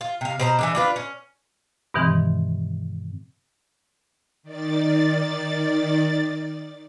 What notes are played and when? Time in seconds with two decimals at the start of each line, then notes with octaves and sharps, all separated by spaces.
0.01 F4
0.21 C3 F5
0.39 B2 C5 A#5
0.59 E3 F#3 D4
0.75 D4 F4 B4
0.96 C#4
1.94 G2 B2 D#3 E3 G#3 C4
4.43 D#3 D5 A6